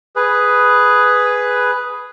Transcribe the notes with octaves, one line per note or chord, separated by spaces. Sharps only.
G#4 B4